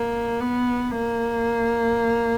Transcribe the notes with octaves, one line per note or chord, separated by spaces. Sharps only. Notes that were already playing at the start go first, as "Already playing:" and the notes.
Already playing: A#3
B3
A#3